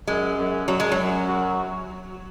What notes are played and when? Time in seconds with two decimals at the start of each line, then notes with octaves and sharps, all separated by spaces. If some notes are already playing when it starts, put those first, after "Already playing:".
0.07 F#2 G#3
0.38 F#2
0.67 F#2 F#3
0.80 G#3
0.92 F#3
0.97 F#2
1.28 F#4